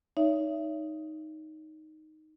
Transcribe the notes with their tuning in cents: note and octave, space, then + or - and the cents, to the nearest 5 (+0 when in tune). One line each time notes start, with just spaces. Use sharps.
D#4 +0 C#5 +35 E5 +20